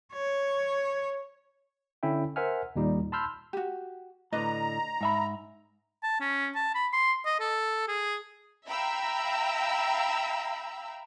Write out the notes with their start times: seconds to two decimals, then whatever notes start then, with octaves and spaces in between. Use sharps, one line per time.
0.13 C#5
2.03 D3 C#4 E4 E5 G5
2.36 A#4 C5 E5 F#5 G#5 F6
2.76 D#2 A#2 G3 D#4
3.12 A5 B5 C6 E6 F6 G6
3.53 F#4 G4
4.33 A2 D3 D4 B4 D#5 A#5
5.01 G#2 E5 B5
6.03 A5
6.20 C#4
6.55 A5
6.75 B5
6.93 C6
7.25 D#5
7.40 A4
7.88 G#4
8.67 E5 F5 G5 A#5 B5 E6